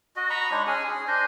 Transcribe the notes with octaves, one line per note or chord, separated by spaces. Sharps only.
F#4 D#5
D#5 A#5 B5 C#6
G#3 D4 D#4 C#5
C#4 G#4 G#5
G#4
D4 C5 D#5 G#5